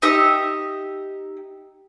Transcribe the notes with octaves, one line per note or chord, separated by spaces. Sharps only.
D#4 G4 E5 D#6